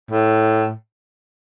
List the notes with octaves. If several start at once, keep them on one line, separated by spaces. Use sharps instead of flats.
A2